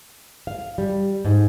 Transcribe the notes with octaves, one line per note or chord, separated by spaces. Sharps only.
F5
G3
G#2